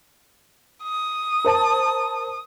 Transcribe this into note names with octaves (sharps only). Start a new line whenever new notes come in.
D#6
A#4 C5 A5